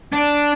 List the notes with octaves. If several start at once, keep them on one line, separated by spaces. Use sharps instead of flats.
D4